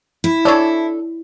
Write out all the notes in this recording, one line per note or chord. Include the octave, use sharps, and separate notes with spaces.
E4
D4 A4 C#5 D5